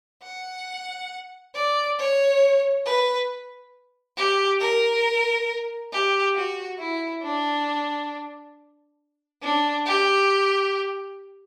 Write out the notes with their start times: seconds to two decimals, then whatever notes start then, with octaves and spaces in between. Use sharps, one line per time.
0.23 F#5
1.55 D5
1.99 C#5
2.86 B4
4.17 G4
4.61 A#4
5.92 G4
6.35 F#4
6.79 E4
7.23 D4
9.42 D4
9.86 G4